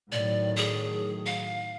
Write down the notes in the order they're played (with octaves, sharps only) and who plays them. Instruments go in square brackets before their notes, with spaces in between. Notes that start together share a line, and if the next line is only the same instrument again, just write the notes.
[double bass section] A2 D#3 F#3 [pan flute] D5
[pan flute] G#4
F5